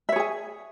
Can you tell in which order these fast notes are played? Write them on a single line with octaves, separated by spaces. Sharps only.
E5 C#5 G#4 G#5